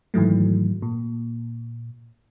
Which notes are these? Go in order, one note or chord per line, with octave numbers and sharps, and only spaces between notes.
G#2 D#3 E3 F#3 A3
A#2